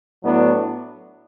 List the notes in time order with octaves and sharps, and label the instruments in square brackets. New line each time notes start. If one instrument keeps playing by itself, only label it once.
[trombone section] A2 F#3 B3 D4